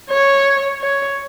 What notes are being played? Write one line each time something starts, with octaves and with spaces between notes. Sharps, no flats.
C#5
C#5